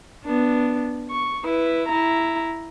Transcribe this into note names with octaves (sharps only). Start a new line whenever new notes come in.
B3 D4
C#6
E4 B4
E4 A#5